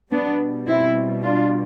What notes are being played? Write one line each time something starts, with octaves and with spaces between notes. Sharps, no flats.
B2 G3 B3 D4
C4 E4
D4 F4